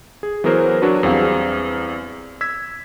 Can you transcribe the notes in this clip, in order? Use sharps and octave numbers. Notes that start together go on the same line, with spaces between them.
G#4
E3 F#3 B3 G#4 A#4 C5
F#3 D4 F#4 B4
E2 G3 C4 G#4 F5
E6 G#6 B6